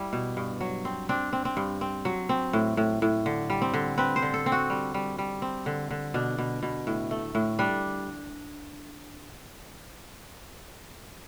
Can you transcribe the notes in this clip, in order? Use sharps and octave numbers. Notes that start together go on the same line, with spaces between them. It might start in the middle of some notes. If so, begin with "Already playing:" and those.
Already playing: G3 E4
B2
G2
F#3
C4
C4 D4
C4
C4
G2
C4
F#3
C4
A2
A2
A2
D3
G3
C4
D3
C4 B4
C5
D3
A4
C4
F#4
G3
G3
G3
C4
D3
D3
B2 D4
B2
B2
A2
A3
A2
G3 D4